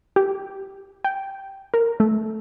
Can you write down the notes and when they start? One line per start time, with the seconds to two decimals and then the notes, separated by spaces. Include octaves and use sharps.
0.16 G4
1.04 G5
1.74 A#4
2.00 A3